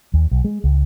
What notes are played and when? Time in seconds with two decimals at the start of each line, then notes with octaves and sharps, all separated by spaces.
0.14 D#2
0.31 B1
0.44 G#3
0.64 C#2